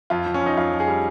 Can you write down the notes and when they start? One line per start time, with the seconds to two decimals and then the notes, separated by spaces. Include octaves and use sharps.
0.10 F2 F4
0.26 F2
0.34 C#4
0.41 F2 D#4
0.57 F2 F4
0.72 F2
0.80 G#4
0.88 G3